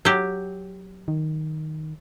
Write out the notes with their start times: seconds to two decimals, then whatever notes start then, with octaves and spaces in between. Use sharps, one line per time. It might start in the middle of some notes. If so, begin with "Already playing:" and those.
0.05 F#3 G4
1.08 D#3